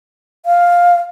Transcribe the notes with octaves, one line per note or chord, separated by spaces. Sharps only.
F5